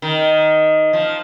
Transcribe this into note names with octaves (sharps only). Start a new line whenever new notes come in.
D#3
F3